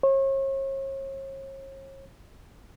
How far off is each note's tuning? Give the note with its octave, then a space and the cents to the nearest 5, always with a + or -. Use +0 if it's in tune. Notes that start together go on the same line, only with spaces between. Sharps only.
C#5 -40